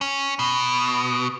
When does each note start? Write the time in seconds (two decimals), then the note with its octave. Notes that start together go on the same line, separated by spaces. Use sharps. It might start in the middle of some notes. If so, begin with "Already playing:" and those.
0.01 C#4
0.39 B2